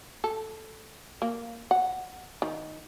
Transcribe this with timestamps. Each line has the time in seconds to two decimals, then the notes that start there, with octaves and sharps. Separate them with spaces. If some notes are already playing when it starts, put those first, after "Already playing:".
0.24 A4
1.22 A#3
1.71 F#5
2.42 D#3